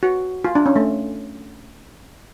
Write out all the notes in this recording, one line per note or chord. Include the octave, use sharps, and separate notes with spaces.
F#4
F4
D4
C#4
A3